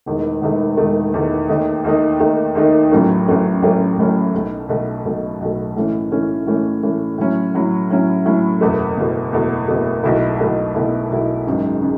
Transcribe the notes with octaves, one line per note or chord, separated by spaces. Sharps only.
E1 E2 D#3 A3
E1 E2 D#3 A3
E1 E2 D#3 A3
E1 E2 D#3 A3
D#2 D#3 A3 D#4
D#2 D#3 A3 D#4
D#2 D#3 A3 D#4
D#2 D#3 A3 D#4
A1 A2 F#3 A3 C#4
A1 A2 F#3 A3 C#4
A1 A2 F#3 A3 C#4
A1 A2 F#3 A3 C#4
B1 B2 A3
B1 B2 A3
B1 B2 A3
B1 B2 A3
A2 E3 A3 C#4
A2 E3 A3 C#4
A2 E3 A3 C#4
A2 E3 A3 C#4
A2 F#3 C#4 E4
A2 F#3 C#4 E4
A2 F#3 C#4 E4
A2 F#3 C#4 E4
F#1 E2 B2 A3
F#1 E2 B2 A3
F#1 E2 B2 A3
F#1 E2 B2 A3
B1 B2 A3 E4
B1 B2 A3 E4
B1 B2 A3 E4
B1 B2 A3 E4
G#1 F#2 C#3 G#3 D#4
C#3 G#3 D#4